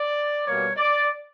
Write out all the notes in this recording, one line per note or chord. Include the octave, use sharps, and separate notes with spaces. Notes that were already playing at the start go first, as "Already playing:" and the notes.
Already playing: D5
B2 G3 A#3 C#5
D5